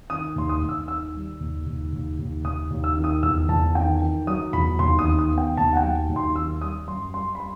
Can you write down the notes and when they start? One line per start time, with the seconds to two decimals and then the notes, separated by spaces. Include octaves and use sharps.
0.10 D#3 D#6
0.36 D#2 C6
0.49 D#6
0.62 D#2
0.69 E6
0.88 D#3 E6
1.14 G3
1.40 D#2
1.66 D#2
1.93 D#2
2.19 D#2
2.44 D#2 D#6
2.71 D#2
2.84 E6
2.97 D#3
3.04 D#6
3.23 E2 E6
3.49 E2 A5
3.75 D#3 G5
4.01 D#3
4.27 F#3 D#6
4.53 E2 B5
4.79 D#2 C6
4.99 D#6
5.05 D#3
5.19 D#6
5.32 B3
5.38 G5
5.57 D#2 A5
5.73 F#5
5.77 G5
5.83 F#3
6.09 D#2
6.16 C6
6.36 D#3 E6
6.61 G3 D#6
6.88 F#2 C6
7.14 G3 C6
7.35 B5
7.40 G3 C6